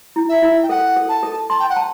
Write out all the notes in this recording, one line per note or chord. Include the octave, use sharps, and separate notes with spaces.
E4
E5
E4
G5
A4 F#5
A4
A5
A4
A5 C6
G5
F#5
A5